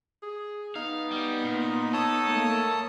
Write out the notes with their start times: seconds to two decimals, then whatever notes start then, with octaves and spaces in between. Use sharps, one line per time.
0.23 G#4
0.75 B3 D#4 F5
1.11 G3
1.44 A#2
1.93 A4 C#5 A5 D#6
2.28 A3 A#3